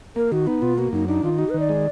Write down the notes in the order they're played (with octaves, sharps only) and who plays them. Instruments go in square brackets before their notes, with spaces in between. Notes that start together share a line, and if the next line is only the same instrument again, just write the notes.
[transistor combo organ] A#3 [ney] A#4
[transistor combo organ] D#3 [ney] F#4
[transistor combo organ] B3 [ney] D#4
[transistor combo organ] B2 [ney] F4
[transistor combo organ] A#3 [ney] F#4
[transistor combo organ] F#2 [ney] D#4
[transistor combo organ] D4 [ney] D#4
[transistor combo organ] D#3 [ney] F4
[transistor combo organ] D#4 [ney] F#4
[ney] B4
[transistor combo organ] D#3
[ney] D5
[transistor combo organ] G#3